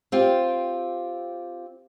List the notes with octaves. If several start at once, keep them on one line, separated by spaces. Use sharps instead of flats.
C4 F4 G4